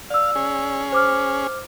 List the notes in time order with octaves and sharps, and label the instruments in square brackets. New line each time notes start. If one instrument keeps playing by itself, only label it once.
[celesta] D5 E6 [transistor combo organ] F5
[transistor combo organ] C#4 G#4
[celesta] C5 D6 F6